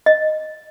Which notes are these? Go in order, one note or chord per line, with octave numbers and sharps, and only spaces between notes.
D#5